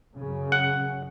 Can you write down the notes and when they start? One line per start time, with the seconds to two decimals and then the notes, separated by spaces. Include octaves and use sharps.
0.15 F#2 C#3
0.52 F#5